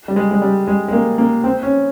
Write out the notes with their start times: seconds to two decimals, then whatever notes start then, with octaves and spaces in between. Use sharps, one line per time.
0.08 G3
0.16 G#3
0.31 G#3
0.42 G3
0.68 G#3
0.88 G#3
0.93 A#3
1.18 A#3
1.44 C4
1.63 C#4